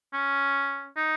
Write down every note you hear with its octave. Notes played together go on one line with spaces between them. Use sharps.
C#4
D#4